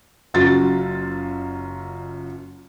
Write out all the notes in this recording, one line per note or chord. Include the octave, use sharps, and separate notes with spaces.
F#1 F#2 F4 F#4 A6